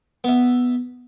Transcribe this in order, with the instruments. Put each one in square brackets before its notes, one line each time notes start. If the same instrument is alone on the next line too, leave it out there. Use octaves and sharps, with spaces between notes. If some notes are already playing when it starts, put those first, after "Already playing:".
[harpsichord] B3 E5